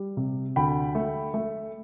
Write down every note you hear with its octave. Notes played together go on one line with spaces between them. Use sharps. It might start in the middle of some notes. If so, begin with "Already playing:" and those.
Already playing: G3
C3
D2 G5 B5
A3
A3